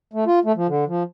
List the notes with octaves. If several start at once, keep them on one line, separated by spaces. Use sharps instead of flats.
A3
F4
A3
F3
D3
F3